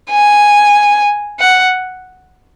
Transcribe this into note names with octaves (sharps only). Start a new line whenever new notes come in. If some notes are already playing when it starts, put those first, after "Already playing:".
G#5
F#5